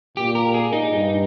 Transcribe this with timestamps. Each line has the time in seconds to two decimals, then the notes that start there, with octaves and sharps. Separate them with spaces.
0.17 A#2 G4
0.35 A#4
0.54 G#4
0.73 D#4
0.90 G2